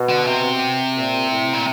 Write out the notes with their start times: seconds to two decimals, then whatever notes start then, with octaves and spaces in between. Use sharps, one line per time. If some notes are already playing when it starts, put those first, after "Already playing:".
Already playing: B2
0.09 D3
0.27 C3
0.96 A#2
1.30 A2
1.53 A#2